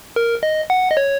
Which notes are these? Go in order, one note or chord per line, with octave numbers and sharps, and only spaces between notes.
A#4
D#5
F#5
D#5
C#5